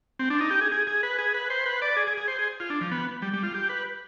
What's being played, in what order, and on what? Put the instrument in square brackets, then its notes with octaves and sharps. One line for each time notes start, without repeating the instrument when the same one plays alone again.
[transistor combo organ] C4
D4
D#4
G4
G#4
G#4
G#4
B4
G#4
B4
C5
B4
D5
G#4
G#4
G#4
C5
G#4
F4
D4
F3
B3
G3
G3
F4
G4
B4